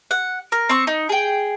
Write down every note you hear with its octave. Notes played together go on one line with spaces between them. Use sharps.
F#5
A#4
C4 C#6
D#4
G#4 G5